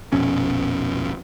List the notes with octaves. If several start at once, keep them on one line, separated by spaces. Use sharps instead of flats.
A#1 F2 B2 C#4